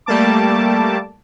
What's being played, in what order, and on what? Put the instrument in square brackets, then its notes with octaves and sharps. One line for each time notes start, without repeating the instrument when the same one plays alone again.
[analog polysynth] G3 A3 A#3 A5 D6